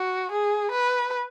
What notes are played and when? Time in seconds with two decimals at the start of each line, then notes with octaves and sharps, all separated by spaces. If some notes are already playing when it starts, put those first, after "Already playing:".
Already playing: F#4
0.32 G#4
0.72 B4